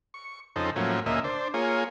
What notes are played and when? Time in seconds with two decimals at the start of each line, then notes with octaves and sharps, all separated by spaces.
0.14 C#6
0.56 F2 C#3 D#4 A4 C5
0.76 A2 F3 F#3 A#3 C#4
1.06 D2 A#2 C#3 A#3 D#5 E5
1.24 D4 C5
1.54 A#3 F4 G#4 C#5